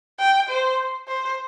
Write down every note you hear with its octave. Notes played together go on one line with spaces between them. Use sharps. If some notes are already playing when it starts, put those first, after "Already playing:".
G5
C5
C5